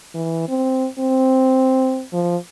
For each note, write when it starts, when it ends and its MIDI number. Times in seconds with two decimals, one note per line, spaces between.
0.14 0.48 52
0.49 0.87 60
0.99 2.03 60
2.13 2.37 53